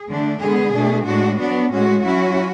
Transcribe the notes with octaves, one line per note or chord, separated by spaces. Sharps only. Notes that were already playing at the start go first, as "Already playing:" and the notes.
Already playing: G#4
D3 A3 D4
D3 G#3 B3 G#4
B2 A3 D4
A2 G#3 D4 F#4
F#3 B3 D4 F#4
A2 G#3 C#4 F#4
F#3 C#4 E4 F#4